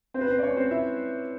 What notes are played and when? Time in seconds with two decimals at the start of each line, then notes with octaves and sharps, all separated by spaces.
0.14 C4 C5
0.21 B4
0.29 C4 C5
0.39 D5
0.43 C#4 C#5
0.57 C4 C5
0.71 E4 E5